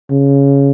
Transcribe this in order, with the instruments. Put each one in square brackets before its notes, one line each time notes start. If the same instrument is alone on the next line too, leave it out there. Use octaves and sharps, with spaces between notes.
[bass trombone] C#3